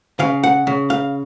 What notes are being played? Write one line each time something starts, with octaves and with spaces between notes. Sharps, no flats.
C#3 F5
F#5
C#3
F5